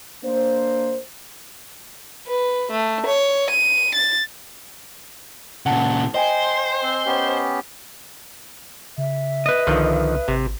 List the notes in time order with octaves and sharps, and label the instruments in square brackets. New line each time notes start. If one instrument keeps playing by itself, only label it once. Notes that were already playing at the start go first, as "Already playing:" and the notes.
[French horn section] A#3 D4 C5
[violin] B4
A3
C#5
D#7
A6
[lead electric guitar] A#2 C#3 [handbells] F#5 A5
[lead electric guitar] C5 [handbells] D#5 G5 G#5
[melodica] C4
B3 C#4 G4
[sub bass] C#3 [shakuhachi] E5
[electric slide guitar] B4 D#5
[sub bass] C2 [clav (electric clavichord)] D3 D#3 F3
[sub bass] G#1 [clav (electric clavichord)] C3